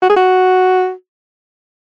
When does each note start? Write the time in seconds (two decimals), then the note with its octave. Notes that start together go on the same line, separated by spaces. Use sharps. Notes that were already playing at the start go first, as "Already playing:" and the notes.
0.02 F#4
0.09 G#4
0.16 F#4